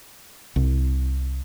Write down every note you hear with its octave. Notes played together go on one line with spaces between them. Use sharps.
C2